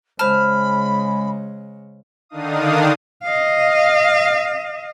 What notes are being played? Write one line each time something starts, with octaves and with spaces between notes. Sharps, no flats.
C#3 G#3 C5 A5 B5 F6
D3 D#3 D4 D#4 F5 D#6
D#5 F5